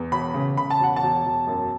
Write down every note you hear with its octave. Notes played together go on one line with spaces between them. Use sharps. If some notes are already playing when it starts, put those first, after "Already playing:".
Already playing: E2
E1 B5
C#3
C#3 B5
A5
E1 F#5
A5
E1
E1
F#2